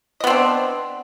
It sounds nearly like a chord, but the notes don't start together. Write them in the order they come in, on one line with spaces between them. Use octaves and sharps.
D#5 B3 C4 D4